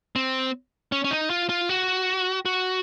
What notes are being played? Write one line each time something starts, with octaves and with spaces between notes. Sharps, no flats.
C4
C#4
C#4
D#4
F4
F4
F#4
F#4